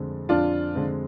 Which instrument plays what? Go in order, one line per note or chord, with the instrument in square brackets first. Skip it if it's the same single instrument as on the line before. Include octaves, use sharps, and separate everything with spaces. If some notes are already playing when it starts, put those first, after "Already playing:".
Already playing: [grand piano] F2 D3 G#3 C4
[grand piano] F2 [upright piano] D4 F4
[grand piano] D3 G#3 C4